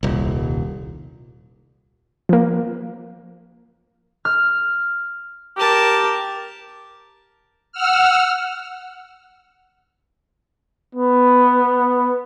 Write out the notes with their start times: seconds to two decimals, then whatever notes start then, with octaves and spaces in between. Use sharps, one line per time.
0.03 D#1 C2
2.29 F3 A#3
4.25 F6
5.57 G4 A#4 A5
7.72 F#5 E6 F6
10.95 B3